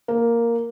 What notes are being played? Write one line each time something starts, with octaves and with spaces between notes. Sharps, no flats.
A#3